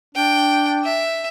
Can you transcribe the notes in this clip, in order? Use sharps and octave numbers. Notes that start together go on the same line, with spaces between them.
D4 G5
E5